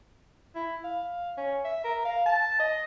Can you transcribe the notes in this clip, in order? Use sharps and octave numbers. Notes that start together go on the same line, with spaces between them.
E4
F5
C#4
E5
A#4
F5
A5
D#5